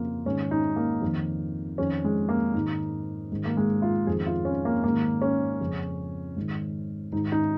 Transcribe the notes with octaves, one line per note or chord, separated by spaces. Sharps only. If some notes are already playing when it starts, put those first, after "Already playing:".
Already playing: F2 C#3 A#3 F4
G#2 D#3 C#4
D#4
A#3
F2 D#3
F2 D#3 C#4
G#3
A#3
G#2 D#3 D#4
G#2 D#3
A#3
G#3
F4
F2 D#3 G#4
F4
C#4
A#3
G#2 D#3 A#3
C#4
F2 C#3
G#2 D#3
G#2 D#3 D#4
D#4